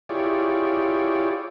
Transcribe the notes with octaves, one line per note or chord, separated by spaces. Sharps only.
E4 F4 G4 G#4 C#5 D5